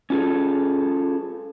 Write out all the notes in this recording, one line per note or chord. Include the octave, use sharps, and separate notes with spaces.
C#4 F4 G#4 A4